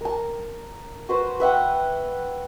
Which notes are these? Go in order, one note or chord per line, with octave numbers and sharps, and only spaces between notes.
A#4 A5
F#4 B4 C5
B4 E5 F#5 G5